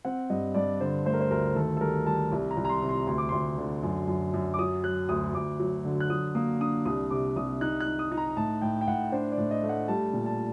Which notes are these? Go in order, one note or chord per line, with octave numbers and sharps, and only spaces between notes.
C4 F#5
G2 D#5
G2 D5
D3 C5
A3 C5
A#4
C5
D2 A#4
D#3 A4
A4
G3 A#4
G3 A5
C2
A#5
C2
A#5
C6
C3
C6
D2 C6
D6
D2 C6
D3
F#2
F#2
F#2
D6
F#3 D#6
F#3 F#6
D2 D#6
D2 D6
F#3
D3
F#6
F#3 D#6
A#3 D#6
D4 D#6
C2 D#6
C3 D6
C2 D#6
D#4 F#6
F#6
D#4
D#6
D#4
A#5
A2 A5
A2 G5
G5
A2 F#5
D4 C5
D5
A2
D#5
A3
F#5
G3 A5
A#2
A5